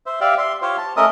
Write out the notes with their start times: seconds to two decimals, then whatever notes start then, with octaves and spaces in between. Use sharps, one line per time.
0.06 C5 E5
0.21 G4 D5 E5 F5
0.38 E5 C6
0.62 F4 G4 C5 C#5 F5
0.78 A5
0.97 A3 C#4 A#4 D#5 E5 D#6